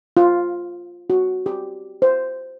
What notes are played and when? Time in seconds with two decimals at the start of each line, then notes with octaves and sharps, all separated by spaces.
0.17 F4
1.10 F#4
1.46 G4
2.02 C5